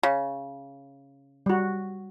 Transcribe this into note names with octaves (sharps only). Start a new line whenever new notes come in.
C#3
G3 F#4